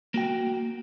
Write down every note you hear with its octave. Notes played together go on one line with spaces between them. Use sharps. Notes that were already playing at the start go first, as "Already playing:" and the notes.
A#3 F#4 G5